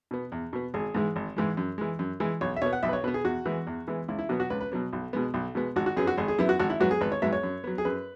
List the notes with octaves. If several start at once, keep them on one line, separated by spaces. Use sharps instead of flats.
B2 B3
E2
B2 B3
G#1 G#4
G#2 E3 G#3
G#1
G#2 E3 G#3
F#2
E3 G#3
F#2
E3 G#3
B1 C#5
E5
B2 B3 C#5
F#5
B1 E5
B4
C#5
B2 B3 B4
G#4
E2 F#4
E3 G#3 B3
E2
E3 G#3 B3
C#2 E4
E4
B2 F#3 B3 F#4
F#4
C#2 B4
B4
B2 F#3 B3
B1
B2 G#3 B3
B1
B2 G#3 B3
G#1 F#4
F#4
F#2 F#3 B3 G#4
F#4
G#1 G#4
G#4
F#2 F#3 B3 E4
F#4
G#1 F#4
E4
G#2 F#3 B3 F#4
G#4
G#1 B4
C#5
G#2 F#3 B3 E5
C#5
F#2
F#3 B3
G#4
F#2 B4